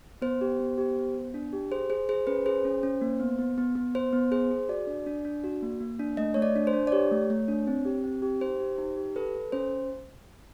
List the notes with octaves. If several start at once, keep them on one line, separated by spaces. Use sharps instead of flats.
B3 C5
G4
B3
G4
B3
B3
D4
G4
G#4 C5
G#4 C5
G#4 C5
C#4 B4
G#4 C5
C#4
C#4
A#3
B3
B3
B3
B3
B3 C5
B3
G#4 C5
G#4
F#4 D5
D4
D4
D4
F#4
A#3
A#3
D4
A3 D#5
A3 C#5
D5
D4
C5
D4
D5
G4 C#5
A3
A3
D4
C4
G4
C4
G4
D#4 C5
G4
D#4
G4
A4 B4
A4
C#4 C5